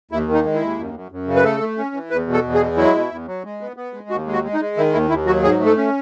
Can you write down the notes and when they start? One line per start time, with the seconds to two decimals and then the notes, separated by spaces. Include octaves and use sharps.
0.11 D#2 E4
0.28 D#3
0.34 D#4
0.45 G#3
0.55 E4
0.61 D#2
0.78 F#2
0.94 F#2
1.12 F#2
1.27 C#3
1.36 B4
1.44 A3 A4
1.60 A3
1.78 C#4
1.95 E3
2.10 E2 B4
2.27 B2
2.33 A4
2.43 E2
2.55 G#4
2.61 G#3
2.77 F#3 E4
2.94 B2
3.11 E2
3.27 F#3
3.44 G#3
3.61 B3
3.76 B3
3.93 G#3
4.10 D#2 F#4
4.27 G#3
4.33 F#4
4.44 G#3
4.54 D#4
4.60 G#3
4.77 D#3 E4
4.93 D#2 E4
5.09 D#2 E4
5.26 F#3 F#4
5.43 G#2 G#4
5.59 A3
5.66 A4
5.77 C#4